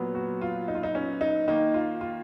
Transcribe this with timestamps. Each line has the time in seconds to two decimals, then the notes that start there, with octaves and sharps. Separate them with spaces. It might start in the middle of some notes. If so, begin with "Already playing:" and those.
Already playing: A#2 F#3 B3
0.15 F#4
0.41 F4
0.68 D#4
0.75 F4
0.83 D#4
0.95 C#4
1.21 D#4
1.48 D#3 A#3 D#4
1.74 F4
2.01 F4